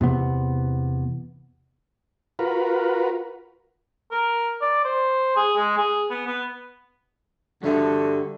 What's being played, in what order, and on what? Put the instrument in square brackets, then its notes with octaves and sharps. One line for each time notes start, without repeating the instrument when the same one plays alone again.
[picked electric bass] E2 C3 B3
[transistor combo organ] F4 F#4 A#4 B4
[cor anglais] A#4
D5
C5
G#4
G#3
G#4
B3
B3
[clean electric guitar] G2 G3 E5 [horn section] D3 F#4